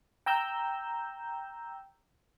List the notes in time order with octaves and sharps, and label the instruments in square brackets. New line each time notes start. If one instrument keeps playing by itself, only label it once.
[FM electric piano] G5 A#5 E6 G6